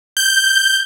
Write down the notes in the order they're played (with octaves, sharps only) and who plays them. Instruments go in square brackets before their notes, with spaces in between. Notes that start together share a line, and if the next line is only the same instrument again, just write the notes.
[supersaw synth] G6